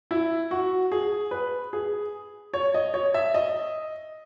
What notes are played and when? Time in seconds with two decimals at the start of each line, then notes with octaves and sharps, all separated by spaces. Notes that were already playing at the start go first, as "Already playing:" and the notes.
0.11 E4
0.51 F#4
0.92 G#4
1.31 B4
1.73 G#4
2.54 C#5
2.74 D#5
2.94 C#5
3.14 E5
3.34 D#5